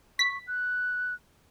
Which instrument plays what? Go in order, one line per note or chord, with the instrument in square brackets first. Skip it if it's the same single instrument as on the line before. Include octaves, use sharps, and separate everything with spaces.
[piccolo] C#6 [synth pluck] B6
[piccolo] F#6